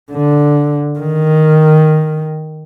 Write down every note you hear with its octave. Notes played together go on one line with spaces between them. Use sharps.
D3
D#3